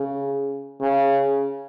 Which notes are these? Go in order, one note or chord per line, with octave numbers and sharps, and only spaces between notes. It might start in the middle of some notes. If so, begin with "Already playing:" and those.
Already playing: C#3
C#3